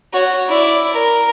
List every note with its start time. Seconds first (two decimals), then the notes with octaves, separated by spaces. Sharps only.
0.13 F#4 C#5
0.48 E4 D5
0.93 A#4